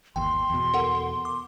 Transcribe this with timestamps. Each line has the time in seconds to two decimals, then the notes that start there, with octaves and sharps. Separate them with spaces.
0.16 G1 D#2 G5 C6
0.50 E2 B2
0.74 A4 A#4 F#5
0.95 A4
1.25 D6